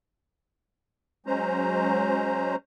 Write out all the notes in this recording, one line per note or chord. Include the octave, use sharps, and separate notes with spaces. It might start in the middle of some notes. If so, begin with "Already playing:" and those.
F#3 G#3 C#4 C5 A#5